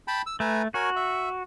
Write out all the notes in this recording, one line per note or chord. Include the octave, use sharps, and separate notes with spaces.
G5 A5 B5
E6
A3 B4 G#5 A#5
F#4 A#4 C#5 G#5
E5